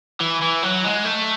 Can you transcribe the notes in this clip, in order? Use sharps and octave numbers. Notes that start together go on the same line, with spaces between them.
E3
E3
F#3
G#3
A3